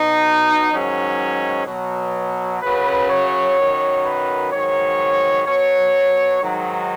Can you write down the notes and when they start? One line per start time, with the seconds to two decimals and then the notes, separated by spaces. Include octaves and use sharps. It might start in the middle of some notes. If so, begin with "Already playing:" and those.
Already playing: B2 F#3 D#4
0.71 G#2 D#3 F#3 C#4
1.67 B2 F#3
2.61 F#2 C#3 F#3 B4
3.09 C#5
3.57 F#2 D#3 F#3
4.04 B4
4.52 G#2 D#3 F#3 C#5
5.46 B2 F#3 C#5
6.41 G#2 D#3 F#3